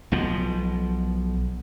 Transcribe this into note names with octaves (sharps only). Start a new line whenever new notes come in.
B1 B2 F3